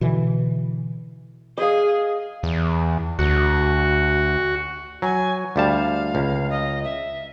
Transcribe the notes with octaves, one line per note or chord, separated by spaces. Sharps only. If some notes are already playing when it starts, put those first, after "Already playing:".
B2 D3 E3
G#4 D#5 F5
E2
D2 F#4
F#3 G#5
D2 G3 F5 A5
C#2
D#5
E5